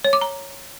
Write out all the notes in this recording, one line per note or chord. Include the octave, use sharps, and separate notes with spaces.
C#5
D6
A#5